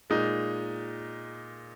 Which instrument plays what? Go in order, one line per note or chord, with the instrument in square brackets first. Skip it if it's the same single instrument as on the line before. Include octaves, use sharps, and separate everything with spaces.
[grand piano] A#2 G#3 D#4